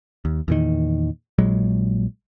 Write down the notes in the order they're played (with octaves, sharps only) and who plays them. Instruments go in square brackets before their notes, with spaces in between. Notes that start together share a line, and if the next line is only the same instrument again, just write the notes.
[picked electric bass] D#2
E2 A#2 D#3
A#1 A#2 F#3 G#3